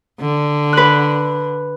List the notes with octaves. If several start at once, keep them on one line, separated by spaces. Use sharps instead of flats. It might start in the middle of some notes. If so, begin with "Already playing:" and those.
D3
B4 F#6